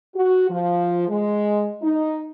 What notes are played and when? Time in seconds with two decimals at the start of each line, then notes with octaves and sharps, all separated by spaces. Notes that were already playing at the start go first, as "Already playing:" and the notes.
0.15 F#4
0.50 F3
1.08 G#3
1.83 D#4